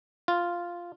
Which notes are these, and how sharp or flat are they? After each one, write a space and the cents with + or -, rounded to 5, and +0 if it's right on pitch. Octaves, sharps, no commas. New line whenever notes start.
F4 -5